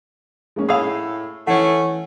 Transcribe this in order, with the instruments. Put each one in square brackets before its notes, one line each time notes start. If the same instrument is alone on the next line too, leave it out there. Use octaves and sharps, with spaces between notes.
[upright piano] G#3 A#3 C#4
[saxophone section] A2 [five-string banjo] G#4 F5 [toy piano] G#5 B5 [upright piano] E6
[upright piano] E3 [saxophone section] A3 C#4 [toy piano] F#5